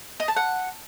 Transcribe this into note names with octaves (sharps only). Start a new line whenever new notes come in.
D#5
A5
F#5